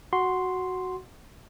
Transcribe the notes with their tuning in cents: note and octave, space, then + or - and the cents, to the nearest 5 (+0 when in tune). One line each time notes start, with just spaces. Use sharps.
F#4 +0 C6 +0